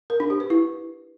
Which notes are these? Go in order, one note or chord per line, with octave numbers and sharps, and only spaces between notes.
A#4
D4
G4
B4
E4